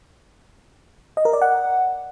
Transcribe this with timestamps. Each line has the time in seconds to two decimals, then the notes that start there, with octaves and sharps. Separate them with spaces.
1.17 D#5
1.25 A#4
1.33 D5
1.42 F#5